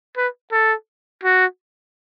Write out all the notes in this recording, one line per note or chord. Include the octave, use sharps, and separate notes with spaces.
B4
A4
F#4